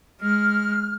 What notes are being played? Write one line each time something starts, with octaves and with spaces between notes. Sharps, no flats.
G#3 F6